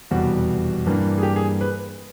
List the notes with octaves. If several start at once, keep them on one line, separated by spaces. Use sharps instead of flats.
F1 E2 B2 G3 F#4
G2 E3 G3 A#3 D4
G#4
G4
G#4
B4